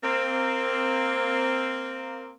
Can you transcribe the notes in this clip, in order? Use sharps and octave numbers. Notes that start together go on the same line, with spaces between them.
A#3 C4